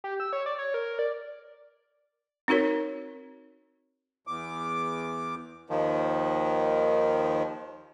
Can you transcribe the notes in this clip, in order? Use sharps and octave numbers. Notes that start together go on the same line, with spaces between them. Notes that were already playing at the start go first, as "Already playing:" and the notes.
G4
E6
C#5
D5
C#5
A#4
D5
C4 D#4 F#4 A#4 C#5
E2 D6
D#2 D#3 F3